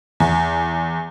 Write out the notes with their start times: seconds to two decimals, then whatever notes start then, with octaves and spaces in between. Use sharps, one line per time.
0.20 E2